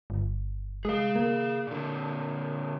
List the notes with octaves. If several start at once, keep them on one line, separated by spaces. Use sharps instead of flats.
G1
G#3 G#4 F5
A#3
A#2 D3